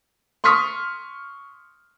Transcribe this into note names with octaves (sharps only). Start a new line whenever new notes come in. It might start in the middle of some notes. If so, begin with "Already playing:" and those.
C6 C#6 D#6 F6 B6